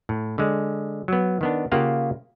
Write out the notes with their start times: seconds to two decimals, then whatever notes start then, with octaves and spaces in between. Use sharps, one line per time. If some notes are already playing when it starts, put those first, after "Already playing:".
0.09 A2
0.38 D3 G#3
1.08 F#3 B3
1.41 D#3 B3 D4
1.72 C#3 A#3 F4 G4 F5 F#5